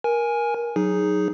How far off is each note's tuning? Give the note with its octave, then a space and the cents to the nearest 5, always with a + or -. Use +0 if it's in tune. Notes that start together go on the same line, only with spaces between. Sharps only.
A#4 +20 G#5 +0
F#3 +0 D#4 +0 G#4 +0